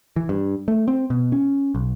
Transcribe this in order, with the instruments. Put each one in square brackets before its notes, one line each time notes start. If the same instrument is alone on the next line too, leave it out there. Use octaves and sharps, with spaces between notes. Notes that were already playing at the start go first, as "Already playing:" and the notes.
[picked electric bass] E3
G2
A3
C4
B2
C#4
B1